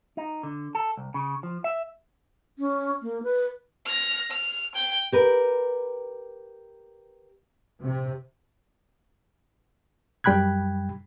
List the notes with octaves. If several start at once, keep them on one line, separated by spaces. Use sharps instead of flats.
D#4
D3
A4
C2
C#3
F3
E5
C#4
A#3
B4
F6 A#6
F6
G5 G6
G4 A#4 B4
C3
F#2 G3 G5 B5 F#6 G#6